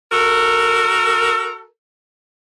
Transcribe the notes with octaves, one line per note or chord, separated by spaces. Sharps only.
F#4 A4 A#4